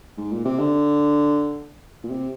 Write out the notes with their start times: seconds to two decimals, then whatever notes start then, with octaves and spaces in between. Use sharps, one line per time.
0.18 G#2
0.32 A#2
0.45 C3
0.59 D3
2.04 A#2
2.09 C3